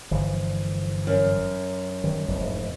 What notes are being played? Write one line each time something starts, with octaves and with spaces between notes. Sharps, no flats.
G1 E3 F3
F#2
D#3 G3
F1 E2 G#2